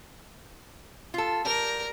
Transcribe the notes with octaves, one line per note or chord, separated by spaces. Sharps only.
F4 A4
G3 A#4